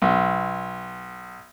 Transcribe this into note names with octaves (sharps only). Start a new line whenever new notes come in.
B1